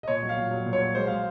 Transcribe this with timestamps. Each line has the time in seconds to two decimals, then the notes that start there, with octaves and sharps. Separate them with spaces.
0.03 D#5
0.08 A#2 C#5
0.22 F#3
0.29 F5
0.37 A#2
0.51 F#3
0.66 A#2
0.73 C#5
0.81 F#3
0.95 G#3 C5
1.07 G#3 F5